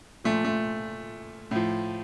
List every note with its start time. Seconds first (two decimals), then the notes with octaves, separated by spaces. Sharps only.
0.24 A#2 F3 A3
0.45 A3
1.51 A2 F3